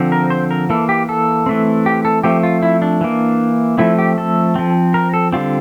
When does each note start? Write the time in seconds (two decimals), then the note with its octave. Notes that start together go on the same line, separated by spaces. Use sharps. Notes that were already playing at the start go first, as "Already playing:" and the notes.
Already playing: D3 F3 C4
0.12 A#4
0.30 C5
0.51 A#4
0.70 E3 A#3 A4
0.89 G4
1.09 A4
1.46 E3 A3 C4
1.86 G4
2.05 A4
2.23 F3 A3 C4 G4
2.43 F4
2.63 E4
2.82 D4
3.01 E3 A#3
3.78 F3 A3 C4 E4
3.99 G4
4.18 A4
4.56 F3 C4
4.94 A#4
5.14 A4
5.33 D3 G3 C4 F4